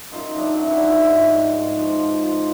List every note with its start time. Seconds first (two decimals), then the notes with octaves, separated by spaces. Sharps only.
0.12 F#2 D#4 F4
0.35 F#3 D4 E4
0.59 D3 C#4 D#4
0.70 D4 E4
0.82 F3 E4 F#4
1.06 G#2
1.29 G#2
1.53 G#2
1.76 F3
1.99 F3
2.22 F3